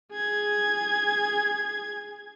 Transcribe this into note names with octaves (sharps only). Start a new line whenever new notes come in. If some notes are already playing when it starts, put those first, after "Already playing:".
G#4 G#6